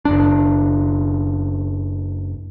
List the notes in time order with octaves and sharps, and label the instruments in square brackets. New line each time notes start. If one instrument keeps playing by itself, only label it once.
[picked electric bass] F#1 D4